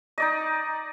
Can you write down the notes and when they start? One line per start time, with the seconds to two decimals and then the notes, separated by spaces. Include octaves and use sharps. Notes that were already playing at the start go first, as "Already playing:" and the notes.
0.18 D#4 D5 D#5